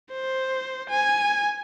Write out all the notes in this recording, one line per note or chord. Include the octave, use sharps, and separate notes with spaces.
C5
G#5